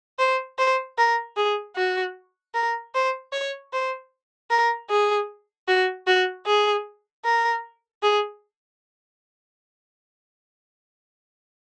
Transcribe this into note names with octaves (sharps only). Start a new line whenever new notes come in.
C5
C5
A#4
G#4
F#4
A#4
C5
C#5
C5
A#4
G#4
F#4
F#4
G#4
A#4
G#4